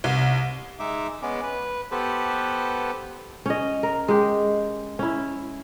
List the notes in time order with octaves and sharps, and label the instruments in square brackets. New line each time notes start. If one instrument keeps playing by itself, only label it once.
[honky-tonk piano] C2
[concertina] G#3 D#4 E5 D6
G#3 B3 C#4 D6
B4
B3 G4 A4 B4 C5
[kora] C#4 D#5
A#4
G#3 G4
C#4 E4